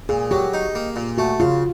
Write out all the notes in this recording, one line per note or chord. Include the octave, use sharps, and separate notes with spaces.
A#2 G#4
F#3 G4
D#4
A#3
A#2
A3 F#4
C#3 F4